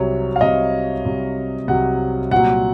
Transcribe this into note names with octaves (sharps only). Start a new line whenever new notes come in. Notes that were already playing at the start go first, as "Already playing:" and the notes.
Already playing: C2 C3 F#3 C#5
F5
C2 C3 F#3 D#5
C2 C3 F#3
C2 C3 F#3 F#5
C2 A#2 F#3 F#5